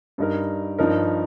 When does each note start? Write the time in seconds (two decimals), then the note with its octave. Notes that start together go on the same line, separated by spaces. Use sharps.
0.18 G2 G3 D#4 A#4
0.79 G2 F3 D#4 A#4